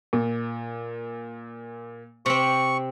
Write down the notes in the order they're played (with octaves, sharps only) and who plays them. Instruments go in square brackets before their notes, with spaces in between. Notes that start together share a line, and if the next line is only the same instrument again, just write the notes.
[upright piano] A#2
[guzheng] C3 C4 [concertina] C#6